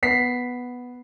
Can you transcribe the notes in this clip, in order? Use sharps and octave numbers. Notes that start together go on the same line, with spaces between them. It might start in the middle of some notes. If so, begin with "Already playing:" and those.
B3 B6 C7